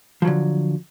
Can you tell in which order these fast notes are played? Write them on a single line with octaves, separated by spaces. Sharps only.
F3 F#3 D3